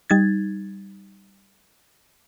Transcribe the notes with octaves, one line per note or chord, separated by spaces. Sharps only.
G3 D#4 G#6 A6